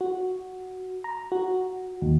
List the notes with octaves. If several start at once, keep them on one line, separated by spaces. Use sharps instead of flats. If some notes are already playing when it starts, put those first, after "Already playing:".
F#4
A#5
F#4
D#2